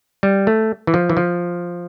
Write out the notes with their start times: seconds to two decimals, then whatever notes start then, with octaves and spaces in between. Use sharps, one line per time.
0.23 G3
0.47 A3
0.87 E3
0.94 F3
1.10 E3
1.17 F3